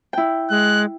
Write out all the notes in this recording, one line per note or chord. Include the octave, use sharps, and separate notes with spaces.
E4 G5
G#3 F#6